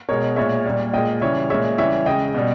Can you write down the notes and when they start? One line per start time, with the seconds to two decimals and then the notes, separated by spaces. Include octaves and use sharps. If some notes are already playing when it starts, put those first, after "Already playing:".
0.09 B2 G#3 A#4 C#5
0.36 A#2 G#3 C#5 E5
0.65 A#2 G3
0.93 A#2 G#3 D#5 G5
1.21 C#3 E3 G3 C#5 E5
1.50 A#2 G#3 C#5 E5
1.78 C#3 E3 G3 C#5 E5
2.06 C#3 G#3 D#5 G5
2.35 B2 G3